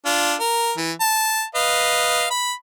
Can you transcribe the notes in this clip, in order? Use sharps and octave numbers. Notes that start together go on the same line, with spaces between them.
D4 F4
A#4
E3
A5
B4 D#5 F5
B5